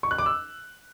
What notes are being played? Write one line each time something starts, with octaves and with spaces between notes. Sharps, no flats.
C#6
F#6
D6
E6